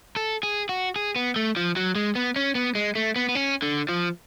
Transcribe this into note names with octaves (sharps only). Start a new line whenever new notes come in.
A4
G#4
F#4
G#4
B3
A3
F3
F#3
G#3
B3
C#4
B3
G#3
A3
B3
B3
C#4
D3
F3